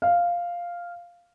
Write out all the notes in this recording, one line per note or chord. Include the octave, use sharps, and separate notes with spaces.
F5